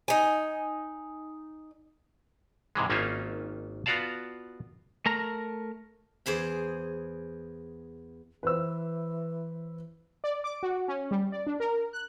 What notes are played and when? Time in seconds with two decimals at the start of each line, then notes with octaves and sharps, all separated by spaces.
0.08 D#4 G#5
2.75 G#2 C3 E3 G#3
2.90 G#1 A#3 C#4 D#4 F4 E5
3.86 B3 F4 F#4 D5 F5 A5
5.06 A3 A#4 A#5
6.26 E2 G#4 C5 B5
8.43 E3 B4 C5 E6
10.24 D5
10.44 D6
10.63 F#4
10.88 C#4
11.11 G3
11.32 D5
11.47 D4
11.60 A#4
11.93 F#6